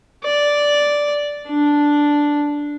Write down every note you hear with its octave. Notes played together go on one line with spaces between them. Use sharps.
D5
D4